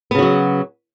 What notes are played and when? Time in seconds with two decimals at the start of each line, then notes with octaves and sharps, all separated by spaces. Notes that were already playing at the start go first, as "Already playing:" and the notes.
0.11 B3
0.15 C#3
0.19 F#4
0.22 F#3